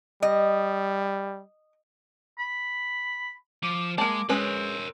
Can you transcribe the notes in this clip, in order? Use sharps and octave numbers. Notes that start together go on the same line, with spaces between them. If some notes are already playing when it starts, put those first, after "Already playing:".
G3 D#5
B5
F3 D6
G#3 A#3 A5 D6
G#3 C4 C#4 A#4 B4 C#5